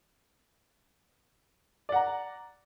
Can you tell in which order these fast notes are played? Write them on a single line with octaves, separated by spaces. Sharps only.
D5 F#5 A#5